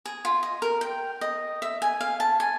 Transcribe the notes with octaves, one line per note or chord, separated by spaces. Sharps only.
G#4
F4
D#5
A#4
G5
D#5
E5
G#5
F5
A5
G#5